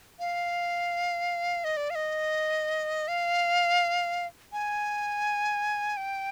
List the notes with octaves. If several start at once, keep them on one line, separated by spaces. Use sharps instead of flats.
F5
D#5
D5
F5
D#5
F5
G#5
G5